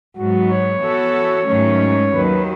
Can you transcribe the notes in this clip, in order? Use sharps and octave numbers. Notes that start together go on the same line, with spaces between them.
G#2 F#3 B3 F#4
C#5
E3 B3 F#4 A4
G#2 D#3 F#3 A3 C#4
D#2 D#3 F#3 B4